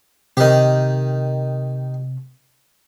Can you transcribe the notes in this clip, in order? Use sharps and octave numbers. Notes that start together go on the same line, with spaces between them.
C3 D#3 G4